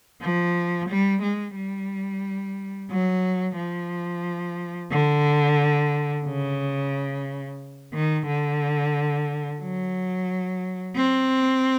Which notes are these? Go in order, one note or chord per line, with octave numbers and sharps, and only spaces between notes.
F3
G3
G#3
G3
F#3
F3
D3
C#3
D#3
D3
F#3
C4